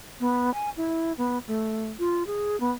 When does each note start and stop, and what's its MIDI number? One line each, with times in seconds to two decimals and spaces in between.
0.20 0.53 59
0.54 0.70 80
0.77 1.13 64
1.18 1.38 59
1.48 1.88 57
1.99 2.23 65
2.27 2.58 68
2.60 2.71 59